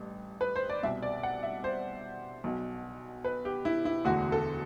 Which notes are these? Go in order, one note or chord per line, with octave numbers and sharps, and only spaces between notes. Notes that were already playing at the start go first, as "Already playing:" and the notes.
Already playing: A1 G2
B4
C5
D5
C2 B2 E5
D5
F#5
E5
C5
B1 B2
B4
G4
E4
E4
E1 D2 D3 F#4
A4